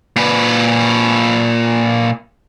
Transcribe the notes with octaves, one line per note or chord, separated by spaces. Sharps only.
A#2 B4